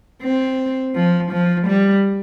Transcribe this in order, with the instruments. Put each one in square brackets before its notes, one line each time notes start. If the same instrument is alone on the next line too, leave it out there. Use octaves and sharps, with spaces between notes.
[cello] C4
F3
F3
G3